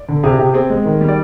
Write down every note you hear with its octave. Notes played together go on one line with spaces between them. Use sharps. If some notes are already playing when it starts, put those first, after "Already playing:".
Already playing: D5
D3
C3 G#4
C3 G4
C4 G#4
G#3
D#3
G3
D5